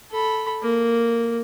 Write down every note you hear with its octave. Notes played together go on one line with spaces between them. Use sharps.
A4 B5
A#3